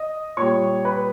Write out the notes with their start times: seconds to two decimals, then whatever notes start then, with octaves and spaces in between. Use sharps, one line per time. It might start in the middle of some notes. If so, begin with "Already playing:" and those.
Already playing: D#5 D#6
0.37 A#2 G3 C#5 C#6
0.85 B4 B5